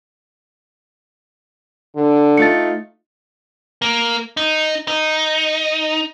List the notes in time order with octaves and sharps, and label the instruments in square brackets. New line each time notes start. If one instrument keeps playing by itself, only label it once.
[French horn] D3
[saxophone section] A3 D#4 F4 [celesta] A6 C#7
[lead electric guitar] A#3
D#4
D#4